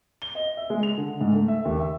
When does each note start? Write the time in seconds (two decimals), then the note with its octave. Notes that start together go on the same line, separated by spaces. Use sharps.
0.22 G7
0.35 D#5
0.57 E5
0.70 G#3
0.83 F7
0.98 D3
1.21 G#2
1.35 A3
1.48 E5
1.65 D#2
1.79 E5